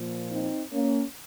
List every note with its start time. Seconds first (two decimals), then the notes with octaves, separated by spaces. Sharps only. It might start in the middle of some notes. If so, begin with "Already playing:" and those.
Already playing: A#2 F3 A#3
0.31 C4 D#4
0.73 A#3 C#4